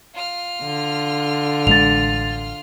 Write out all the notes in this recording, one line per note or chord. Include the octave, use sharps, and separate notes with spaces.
F4 F6
D3
A1 G#3 D4 A6 F7